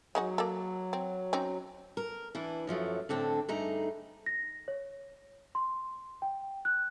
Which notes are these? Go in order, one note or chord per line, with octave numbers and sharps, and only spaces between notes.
F#3 G#3 D#4 F#4
A#3 A4
C4
C4 C#4 D#4
A#4
E3 D4 E4
F#2 F3 F#3 A3
A2 D3 C4 D4
G2 A3 D#4 G#4 A#5
A#6
C#5
C6
G5
F#6